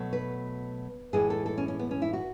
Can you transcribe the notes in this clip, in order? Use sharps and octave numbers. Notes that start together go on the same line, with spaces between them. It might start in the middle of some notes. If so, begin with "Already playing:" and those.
Already playing: B2 F#3 A3
B4
A2 E3 G#3 G#4
A4
A4
C#4
C#4
B3
C#4
E4
F#4